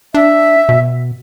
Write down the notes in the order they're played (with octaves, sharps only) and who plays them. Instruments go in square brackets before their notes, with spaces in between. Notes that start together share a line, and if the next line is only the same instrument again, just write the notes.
[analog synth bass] D4 [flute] E5
[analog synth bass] B2